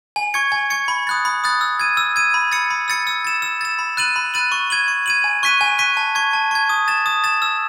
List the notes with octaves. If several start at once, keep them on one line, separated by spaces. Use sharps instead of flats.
G#5
C#6 G#6 C#7
G#5
C#6 G#6 C#7
B5
D#6 F#6 A6
B5
D#6 F#6 A6
E6
G#6 D#7
E6
G#6 D#7
B5
E6 A6 C#7
B5
E6 A6 C#7
E6
A6 E7
E6
A6 E7
B5
F#6 A6 D#7 F#7
B5
F#6 A6 D#7 F#7
C#6
G#6 D#7 F#7
C#6
G#6 D#7 F#7
G#5
C#6 F#6 B6 D#7
G#5
C#6 F#6 B6 D#7
A5
C#6 G#6
A5
C#6 G#6
D#6
A6 E7
D#6
A6 E7
E6